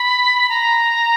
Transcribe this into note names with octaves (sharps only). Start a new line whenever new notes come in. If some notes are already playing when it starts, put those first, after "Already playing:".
Already playing: B5
A#5